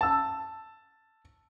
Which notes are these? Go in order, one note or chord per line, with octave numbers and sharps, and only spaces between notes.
A5 E6